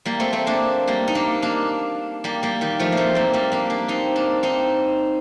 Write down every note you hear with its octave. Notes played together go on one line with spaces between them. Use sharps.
G3 A#3
A3 C4
A3 C4
A#3 D4
G3 A#3
D#4
A#3 D4
A#3 D4
G3 A#3
G3 A#3
D#3 G3
F3 A3
A#3
A3 C4
G3 A#3
G3 A#3
A#3 D4
A#3 D4
C4 D#4
A#3 D4
C4 D#4